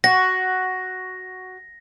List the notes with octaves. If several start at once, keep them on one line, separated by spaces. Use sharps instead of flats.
F#4 A#6